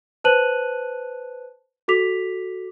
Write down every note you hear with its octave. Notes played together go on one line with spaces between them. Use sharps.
B4 C5 A5 F#6 D#7 F#7
F#4 A4 D6 B6 F7